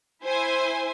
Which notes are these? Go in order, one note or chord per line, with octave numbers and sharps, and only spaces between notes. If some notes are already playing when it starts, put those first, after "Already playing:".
E4 C5 G#5